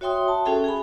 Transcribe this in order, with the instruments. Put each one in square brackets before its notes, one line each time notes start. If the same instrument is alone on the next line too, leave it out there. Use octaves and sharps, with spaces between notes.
[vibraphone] F#4 C#5 E5 G5 C6 D#6
A5
C#4 F#4 G#4 A4 E5 G5
G#4 G#5 B5